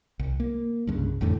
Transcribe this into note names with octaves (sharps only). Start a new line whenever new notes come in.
C2
A#3
C2 G2 C#3
F1 E2 A2 D3